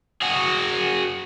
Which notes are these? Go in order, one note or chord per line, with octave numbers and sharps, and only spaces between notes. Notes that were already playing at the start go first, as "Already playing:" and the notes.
F#4 G#4